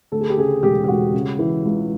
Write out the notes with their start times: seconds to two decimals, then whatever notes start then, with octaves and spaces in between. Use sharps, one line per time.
0.12 D2 A4
0.21 G#4
0.30 G4
0.37 C#3 G#4
0.63 E1 G4
0.84 G4
0.88 E1 F#4
1.14 C#3
1.39 E3
1.65 C#2